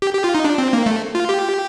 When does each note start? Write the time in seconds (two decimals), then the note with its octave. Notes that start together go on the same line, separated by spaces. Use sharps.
0.02 G4
0.13 G4
0.24 F4
0.35 D#4
0.45 D4
0.58 C4
0.73 A#3
0.86 A3
1.15 F4
1.29 G4